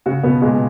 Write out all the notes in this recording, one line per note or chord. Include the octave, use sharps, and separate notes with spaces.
C#3 F#4
B2 B3
A#2 G#3